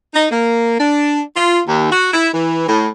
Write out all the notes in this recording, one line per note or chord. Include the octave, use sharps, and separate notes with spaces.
D#4
A#3
D4
F4
D#2
F#4
E4
E3
A2